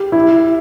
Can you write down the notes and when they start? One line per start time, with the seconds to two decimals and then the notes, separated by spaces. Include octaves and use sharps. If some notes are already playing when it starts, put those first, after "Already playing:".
Already playing: G4
0.12 E4